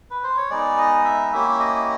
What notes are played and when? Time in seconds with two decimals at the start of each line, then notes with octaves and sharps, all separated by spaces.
0.11 B4
0.24 C5
0.37 C#5
0.50 G#3 B3 D#4 D5
0.78 D#5
1.05 E5
1.33 A#3 C#4 E4 G4 E5
1.60 D#5